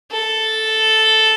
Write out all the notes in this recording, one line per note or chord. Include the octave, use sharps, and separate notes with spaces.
A4